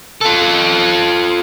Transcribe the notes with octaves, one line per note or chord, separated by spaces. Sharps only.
F4 A4